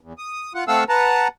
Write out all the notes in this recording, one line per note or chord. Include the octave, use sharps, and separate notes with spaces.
E2
D#6
F4 F#5
A3 C4 A4 F5 F#5 E6
B4 F#5 A5 A#5